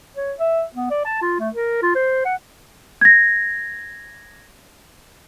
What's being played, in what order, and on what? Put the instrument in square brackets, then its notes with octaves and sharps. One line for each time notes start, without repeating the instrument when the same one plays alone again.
[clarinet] C#5
E5
B3
D5
A5
F4
A3
A#4
F4
C5
F#5
[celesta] G#6 A#6